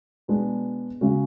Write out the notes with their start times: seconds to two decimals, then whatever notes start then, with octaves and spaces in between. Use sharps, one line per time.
0.28 B2 G#3 B3 D4
1.01 C#3 G#3 C#4 F#4